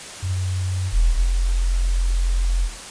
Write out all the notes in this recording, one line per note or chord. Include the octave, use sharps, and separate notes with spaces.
F#2
E1
F1